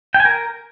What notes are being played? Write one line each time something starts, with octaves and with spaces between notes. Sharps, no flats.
G5
G#5
A#4